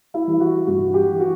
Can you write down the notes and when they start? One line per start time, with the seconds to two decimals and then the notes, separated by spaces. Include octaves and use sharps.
0.14 E4
0.27 E3 G3
0.40 F#4
0.67 G2 F#4
0.94 G4
1.07 E3 G3
1.20 F#4